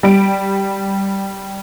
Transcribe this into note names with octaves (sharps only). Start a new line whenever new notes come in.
G3 D7